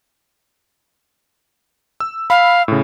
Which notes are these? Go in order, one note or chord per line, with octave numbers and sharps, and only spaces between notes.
E6
F5 B5
A2 C#3